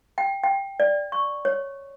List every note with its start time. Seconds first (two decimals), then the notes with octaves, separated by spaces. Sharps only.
0.18 G5
0.44 G5
0.80 D5
1.12 C#6
1.45 C#5